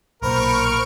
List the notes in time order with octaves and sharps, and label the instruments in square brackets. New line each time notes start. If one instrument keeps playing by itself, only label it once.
[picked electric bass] B1 A#2 [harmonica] A#4 [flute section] C5 B5 [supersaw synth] C#6 F6 D7